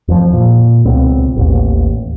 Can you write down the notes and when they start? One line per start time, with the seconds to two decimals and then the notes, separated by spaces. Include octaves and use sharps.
0.08 F2 F3
0.33 A#2
0.85 C#2 B2 C4
1.36 A1 D#2